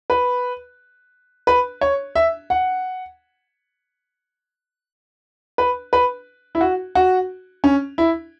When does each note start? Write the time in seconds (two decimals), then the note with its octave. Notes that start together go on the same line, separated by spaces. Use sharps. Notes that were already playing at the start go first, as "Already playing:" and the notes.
0.10 B4
1.47 B4
1.81 C#5
2.15 E5
2.50 F#5
5.58 B4
5.93 B4
6.55 E4
6.61 F#4
6.95 F#4
7.64 C#4
7.98 E4